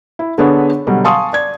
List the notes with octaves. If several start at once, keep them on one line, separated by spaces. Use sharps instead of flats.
E4
D3 B3 D4 G#4 B4 C#5
B2 D3 F#3 G3
F5 G#5 A5 C6 C#6 D#6
D5 G#6